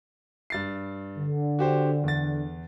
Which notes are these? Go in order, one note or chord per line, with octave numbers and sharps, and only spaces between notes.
G2 A6 C7
D3
F#4 G4 C5
E2 A6